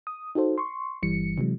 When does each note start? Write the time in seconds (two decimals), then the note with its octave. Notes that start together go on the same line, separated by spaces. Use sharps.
0.07 D#6
0.35 D#4 F#4 A4 C5
0.58 C6 C#6
1.03 G1 G2 E3 G3 C#7
1.38 C3 E3 F#3 G#3